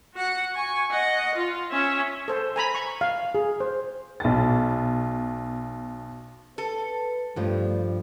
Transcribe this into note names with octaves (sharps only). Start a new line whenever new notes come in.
F#4 F#5
G#5 C#6
D#5 F#5
F4
C#4 E5
A4 C5
G#5 A#5 B5
C#6
F5
G#4
C5
B1 A6
A4 B4
G2 F3 G3 A3